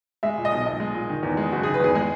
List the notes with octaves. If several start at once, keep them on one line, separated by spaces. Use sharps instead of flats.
G#3 E5
A#2
D#5
B1
B1 D#5
G#3
A#2
D#3
E2
G#3
F#1 F#4
D#3 G#4
B4
E2 G#4
G#3 G#4